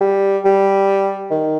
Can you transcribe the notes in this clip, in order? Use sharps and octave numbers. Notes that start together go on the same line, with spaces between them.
G3
G3
D#3